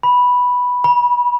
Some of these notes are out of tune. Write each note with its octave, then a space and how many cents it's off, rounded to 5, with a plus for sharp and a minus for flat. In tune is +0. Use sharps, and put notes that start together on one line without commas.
B5 -5
B5 -30